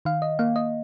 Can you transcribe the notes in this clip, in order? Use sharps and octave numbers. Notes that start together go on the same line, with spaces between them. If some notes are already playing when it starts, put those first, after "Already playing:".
D#3 F5
D#5
A#3 F5
D#5